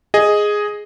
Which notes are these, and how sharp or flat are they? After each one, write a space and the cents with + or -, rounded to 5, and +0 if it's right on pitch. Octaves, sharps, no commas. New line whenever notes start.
G#4 +0 D#5 +0